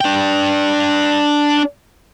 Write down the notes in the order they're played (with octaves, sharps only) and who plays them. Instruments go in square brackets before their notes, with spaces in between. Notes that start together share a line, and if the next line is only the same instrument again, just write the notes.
[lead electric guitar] D4 G5